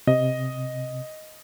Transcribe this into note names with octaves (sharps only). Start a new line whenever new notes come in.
C3 D#5